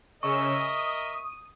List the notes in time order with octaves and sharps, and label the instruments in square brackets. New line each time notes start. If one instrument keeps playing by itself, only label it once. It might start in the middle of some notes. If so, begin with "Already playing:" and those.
[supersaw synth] C#3 C#4 E6 [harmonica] A#4 D#5 E5 [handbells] C#6
[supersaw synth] D#6